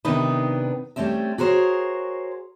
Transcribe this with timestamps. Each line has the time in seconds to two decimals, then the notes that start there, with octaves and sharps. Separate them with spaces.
0.05 C3 D#3 B3 D4 D#4 B4
0.96 G3 A3 C4 C#4 E5
1.38 F#4 G#4 A#4 C5 C#5